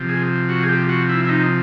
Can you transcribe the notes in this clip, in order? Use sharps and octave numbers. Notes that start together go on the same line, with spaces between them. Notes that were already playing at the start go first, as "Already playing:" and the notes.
Already playing: C3 F3
G#4
F#4
G#4
G4
F#4
E4
E4
D#4